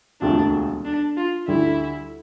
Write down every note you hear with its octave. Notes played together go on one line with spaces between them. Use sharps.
E1 D2 C3 F3 A3 D4
D4
F4
D2 D3 G3 E4